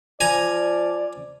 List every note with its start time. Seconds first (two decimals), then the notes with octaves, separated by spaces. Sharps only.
0.21 F3 D5 G#5 A#5